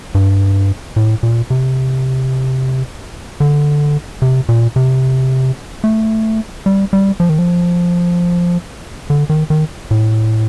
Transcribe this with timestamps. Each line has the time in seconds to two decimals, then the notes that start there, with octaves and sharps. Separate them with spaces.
0.15 G2
0.96 A2
1.23 A#2
1.50 C3
3.40 D3
4.22 C3
4.49 A#2
4.76 C3
5.84 A3
6.66 G3
6.93 G3
7.20 F3
7.29 D#3
7.39 F3
9.10 D3
9.30 D#3
9.50 D#3
9.91 A2